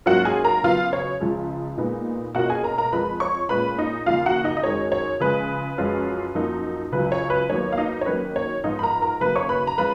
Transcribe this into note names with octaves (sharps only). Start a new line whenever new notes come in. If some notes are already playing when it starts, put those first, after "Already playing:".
G#2 F#3 A#3 C#4 F4 F#4 F#5
G#4 G#5
A#4 A#5
C#3 F#3 B3 F4 F5
C#5
C#2 C#3 F3 G#3
A#2 G#3 B3 D#4
B2 A#3 C#4 F4 F#4 F#5
G#4 G#5
A#4 A#5
A#4 A#5
F2 F3 G#3 B4 B5
C#5 C#6
A#2 G#3 C#4 F4 B4 B5
D#4 D#5
D#2 C#3 F3 F4 F5
F#4 F#5
D#4 D#5
D#5
F#2 D#3 G#3 C#5
C#5
C#3 F3 G#3 B4
F#2 F3 G#3 C#4 F4
F#2 F3 A#3 D#4
C#2 C#3 F#3 B4
C#5
B4
D#2 D#3 F#3 B3 C#5
F5
D#4 D#5
C#5
D#2 D#3 F#3 C#4 B4
C#5
G#2 F3 B3 D#4 F4 D#5
B5
A#4 A#5
A#4 A#5
D#2 C#3 F#3 B4 B5
C#5 C#6
B4 B5
A#5
F3 G#3 C#4 F4 B4 B5